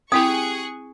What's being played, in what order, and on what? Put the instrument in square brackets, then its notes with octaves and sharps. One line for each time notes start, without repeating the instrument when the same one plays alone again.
[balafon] C4 E4 [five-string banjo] G4 G5 [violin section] G#4 C#6 F#6 [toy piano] D#6